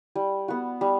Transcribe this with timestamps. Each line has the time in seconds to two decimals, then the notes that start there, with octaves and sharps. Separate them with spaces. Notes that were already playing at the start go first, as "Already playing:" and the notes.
0.15 G3
0.48 B3 F#4
0.81 G3